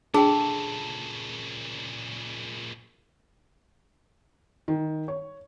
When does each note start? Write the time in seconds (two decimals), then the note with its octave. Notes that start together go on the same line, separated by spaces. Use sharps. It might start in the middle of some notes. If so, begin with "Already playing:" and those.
0.14 A#2 C#3 D4 G#4 A4 G5
4.68 D#3
5.08 C#5